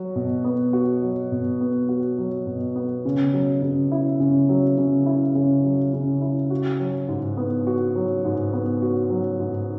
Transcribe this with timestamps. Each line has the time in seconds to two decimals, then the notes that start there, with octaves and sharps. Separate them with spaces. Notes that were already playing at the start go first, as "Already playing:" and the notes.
Already playing: F#3 F#4
0.16 B2
0.44 B3
0.73 F#4
1.02 F#3
1.32 B2
1.61 B3
1.89 F#4
2.18 F#3
2.47 B2
2.75 B3
3.05 C#3
3.33 F#3
3.62 C#3
3.92 E4
4.20 C#3
4.49 F#3
4.78 C#3
5.06 E4
5.35 C#3
5.64 F#3
5.94 C#3
6.22 E4
6.50 F#4
6.80 F#3
7.08 G#2
7.37 B3
7.67 F#4
7.95 F#3
8.25 G#2
8.53 B3
8.82 F#4
9.10 F#3
9.40 G#2